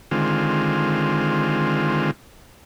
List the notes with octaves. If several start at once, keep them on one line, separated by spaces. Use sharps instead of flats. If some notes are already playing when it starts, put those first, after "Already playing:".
D3 D#3 G#3 C4 F4